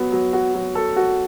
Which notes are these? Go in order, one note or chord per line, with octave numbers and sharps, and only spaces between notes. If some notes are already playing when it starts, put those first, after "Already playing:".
Already playing: F#3 B3
F#3
F#4
F#3
A4
F#4